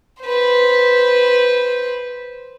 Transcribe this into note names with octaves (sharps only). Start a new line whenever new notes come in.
B4 C5